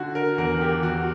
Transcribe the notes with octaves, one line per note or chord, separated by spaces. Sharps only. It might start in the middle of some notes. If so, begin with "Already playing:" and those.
Already playing: D3 F#4
A#4
E2 A#4
A#4
G4
E2 F#4